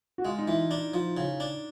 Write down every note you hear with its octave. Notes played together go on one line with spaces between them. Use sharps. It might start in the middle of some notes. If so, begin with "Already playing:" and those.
F#4
G#3 F4
D#4
E3 E4
D4 D#4
F3
C#3
D4